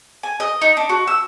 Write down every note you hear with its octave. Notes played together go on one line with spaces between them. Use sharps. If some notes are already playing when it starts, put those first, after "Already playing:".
G#5
D#5
D#4
D4
F#4
E6